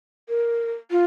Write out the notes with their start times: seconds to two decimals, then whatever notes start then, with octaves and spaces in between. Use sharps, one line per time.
0.29 A#4
0.91 F4